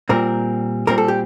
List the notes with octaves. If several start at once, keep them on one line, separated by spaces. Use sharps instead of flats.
A#2 G3 C4 A#4
A#2 G3 C4 A#4
A4
G4